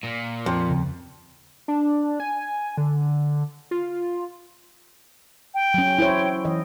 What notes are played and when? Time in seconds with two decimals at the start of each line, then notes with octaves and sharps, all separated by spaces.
0.03 A#2
0.46 F2
0.68 D#2 C#3
1.68 D4
2.20 G#5
2.77 D3
3.71 F4
5.54 G5
5.74 F#3 C#4
5.99 E4 C5 C#5
6.45 E3 D#5